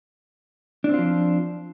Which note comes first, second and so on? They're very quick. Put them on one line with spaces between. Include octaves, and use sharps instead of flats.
D4 C4 F4 F3